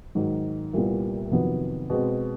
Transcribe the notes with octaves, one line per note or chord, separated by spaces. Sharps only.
G#2 D#3 F#3
C2 A#2 G3 B3
F2 C3 D#3 F#3 B3
B2 G#3 C4